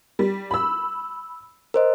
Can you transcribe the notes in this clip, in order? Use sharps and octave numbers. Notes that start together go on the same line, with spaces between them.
G3
B5 E6
A#4 C5 D#5